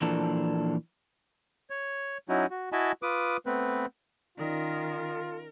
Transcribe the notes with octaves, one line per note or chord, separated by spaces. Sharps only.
A#2 E3 F3 D4 A4 A#4
C#5
F#3 C#4 D#4 E4 F#4
F#4
E4 F#4 D#5 G#5 A5 B5
F4 B4 D6 D#6
A3 B3 C4 B4
D#3 C#4 D#4 F4 A#4 D5